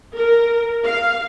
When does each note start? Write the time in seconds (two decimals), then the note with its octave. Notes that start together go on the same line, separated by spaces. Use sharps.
0.16 A#4
0.86 F5